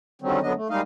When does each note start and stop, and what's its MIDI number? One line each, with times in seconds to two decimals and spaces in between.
0.22 0.39 50
0.22 0.39 51
0.22 0.39 54
0.22 0.39 55
0.22 0.39 60
0.22 0.39 61
0.43 0.53 42
0.43 0.53 50
0.43 0.53 54
0.43 0.53 59
0.43 0.53 62
0.43 0.53 75
0.56 0.68 57
0.70 0.81 55
0.70 0.81 56
0.70 0.81 58
0.70 0.81 63
0.70 0.81 75
0.70 0.81 77